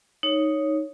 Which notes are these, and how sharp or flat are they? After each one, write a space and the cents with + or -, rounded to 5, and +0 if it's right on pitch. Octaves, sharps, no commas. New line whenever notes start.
D#4 +0 C#5 +0